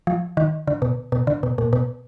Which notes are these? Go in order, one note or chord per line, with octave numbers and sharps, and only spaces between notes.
F3
D#3
D3
B2
B2
D3
B2
A#2
B2